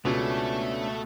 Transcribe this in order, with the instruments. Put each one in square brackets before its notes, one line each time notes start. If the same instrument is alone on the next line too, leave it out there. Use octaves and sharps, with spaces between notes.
[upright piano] C#2 B2 [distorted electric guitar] A3 [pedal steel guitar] B3 C#4 D4